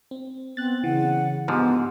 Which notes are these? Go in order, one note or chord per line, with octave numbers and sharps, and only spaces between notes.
C4
B3 C4 F#6 A6
C#3 E3 F#5
G#2 D3 F3 B3 G4